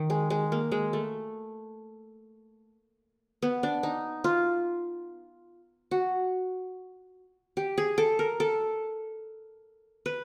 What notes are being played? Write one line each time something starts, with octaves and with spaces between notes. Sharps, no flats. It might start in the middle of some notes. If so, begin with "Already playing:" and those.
Already playing: D#3
G#3
G#3
A#3
G#3
A3
B3
D4
D#4
F4
F#4
G4
G#4
A4
A#4
A4
B4